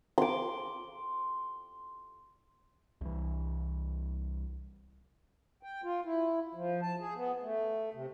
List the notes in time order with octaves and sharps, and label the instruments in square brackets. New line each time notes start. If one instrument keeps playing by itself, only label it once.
[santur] C6 D6
[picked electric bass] C2 E3
[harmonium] G5
F4
E4
F3
A5
G#4
B3
A3
C3